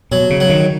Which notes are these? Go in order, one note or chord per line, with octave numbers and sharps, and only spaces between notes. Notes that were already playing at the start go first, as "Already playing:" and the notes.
B2 F#3
C#3
F#3
D#3